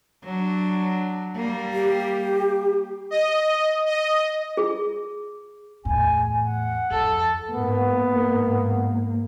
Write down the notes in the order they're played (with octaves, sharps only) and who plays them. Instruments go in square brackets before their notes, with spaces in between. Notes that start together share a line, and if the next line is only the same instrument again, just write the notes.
[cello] F#3 D4
G3 A#3
[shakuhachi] G4
[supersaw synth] D#5
D#5
[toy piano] G#4
[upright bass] E2 A2 [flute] G#5
[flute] F#5
[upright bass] F2 [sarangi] A4
[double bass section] G#2 A#3 [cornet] B3